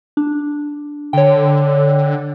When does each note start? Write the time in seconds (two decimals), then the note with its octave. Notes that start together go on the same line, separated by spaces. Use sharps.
0.17 D4
1.13 D3 C#5 G5